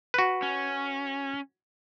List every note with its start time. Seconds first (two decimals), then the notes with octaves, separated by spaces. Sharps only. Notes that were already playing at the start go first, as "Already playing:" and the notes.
0.14 F#4 B4
0.42 C#4